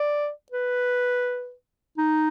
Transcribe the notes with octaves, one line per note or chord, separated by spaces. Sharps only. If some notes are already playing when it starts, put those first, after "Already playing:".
Already playing: D5
B4
D#4